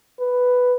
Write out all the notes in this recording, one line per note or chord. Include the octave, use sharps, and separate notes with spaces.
B4